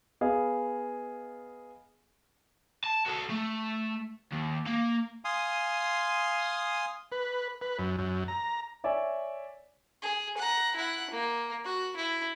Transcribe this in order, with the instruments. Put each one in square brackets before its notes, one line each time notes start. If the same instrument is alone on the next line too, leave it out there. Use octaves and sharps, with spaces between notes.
[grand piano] B3 G#4 D#5 F5
[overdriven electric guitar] A5
F#4 A4
A3
D#2
A#3
[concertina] F5 G#5 C6 D#6
[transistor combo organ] B4
B4
F#2
F#2
A#5
[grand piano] C#5 D5 E5 G#5
[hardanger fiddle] G#4
F#5 A#5
E4 F#5
A#3
F#4
E4